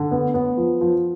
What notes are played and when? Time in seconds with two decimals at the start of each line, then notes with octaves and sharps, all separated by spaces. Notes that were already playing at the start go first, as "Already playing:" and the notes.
Already playing: D3
0.11 B3
0.34 B3
0.57 F3
0.81 F3